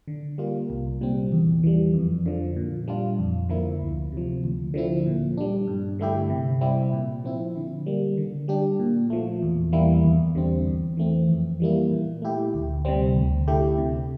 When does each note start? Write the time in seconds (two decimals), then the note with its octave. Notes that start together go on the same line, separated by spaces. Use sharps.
0.08 D3
0.38 G3 A#3 F4
0.70 C2
1.01 A#2 G3 C4
1.32 E2
1.63 E3 G3
1.94 F2
2.26 D3 F3
2.56 A#2
2.88 G3 D4 F4
3.19 F2
3.49 D3 F3 A#3 E4
3.82 D2
4.12 C3 F3
4.44 D2
4.74 D3 F3 C4 E4
5.06 A#2
5.37 G3 D4
5.67 G2
5.99 D3 A3 E4 G4
6.30 C3
6.61 G3 C4 E4 G4
6.93 A#2
7.24 F3 C4 E4
7.56 D3
7.86 G3 A#3
8.17 D3
8.48 G3 D4 G4
8.79 A#2
9.10 F3 A3
9.43 E2
9.73 E3 G3 A#3 E4
10.04 E2
10.35 D3 G3 C4
10.67 E2
10.97 E3 A3 C4
11.28 F2
11.60 E3 G3 A#3 E4
11.91 A#2
12.22 A3 E4 G4
12.54 D2
12.85 C3 G3 C4
13.16 D2
13.48 D3 A3 E4 G4
13.78 C3